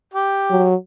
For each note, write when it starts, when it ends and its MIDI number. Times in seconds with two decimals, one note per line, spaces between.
0.14 0.66 67
0.50 0.75 54